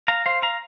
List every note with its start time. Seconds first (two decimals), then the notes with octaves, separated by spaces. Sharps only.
0.08 F5 A#5
0.26 C5 F5
0.42 F5 A#5